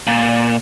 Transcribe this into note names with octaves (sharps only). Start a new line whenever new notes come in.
A#2